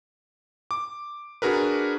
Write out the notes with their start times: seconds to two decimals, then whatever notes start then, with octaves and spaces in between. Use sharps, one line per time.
0.71 D6
1.42 D4 F#4 G#4 A#4 B4